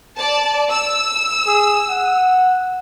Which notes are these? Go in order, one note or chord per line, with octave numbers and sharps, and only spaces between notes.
D5 A5
E6
G#4
F#5